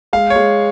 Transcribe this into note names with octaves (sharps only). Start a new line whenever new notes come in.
G#3 F5
C#5
G#3